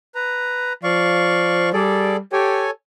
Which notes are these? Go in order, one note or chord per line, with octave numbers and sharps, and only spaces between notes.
B4 A#5
F3 D5 F5 C#6
G3 G#4 A4 D5
G4 A4 C#5 G#5